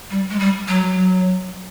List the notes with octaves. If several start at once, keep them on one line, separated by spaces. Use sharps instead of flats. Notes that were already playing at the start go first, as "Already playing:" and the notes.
G3
G#3
G3
F#3